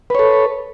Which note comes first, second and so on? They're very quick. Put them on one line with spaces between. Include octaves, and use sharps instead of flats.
B4 C#5 A4